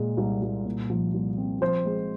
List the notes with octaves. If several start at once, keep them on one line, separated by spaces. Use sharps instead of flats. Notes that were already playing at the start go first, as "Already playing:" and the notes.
Already playing: A#2 G#3
C2
C2
A#2
F3
C2
C4
F3 C5
G#3